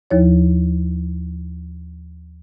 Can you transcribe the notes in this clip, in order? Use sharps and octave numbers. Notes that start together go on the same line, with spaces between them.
D#2 F3 E4 C#5